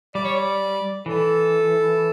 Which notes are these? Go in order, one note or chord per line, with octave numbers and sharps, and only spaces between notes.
G3 D5
C#5
D5
E3 A4